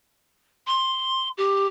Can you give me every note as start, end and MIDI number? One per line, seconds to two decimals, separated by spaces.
0.67 1.28 84
1.37 1.66 67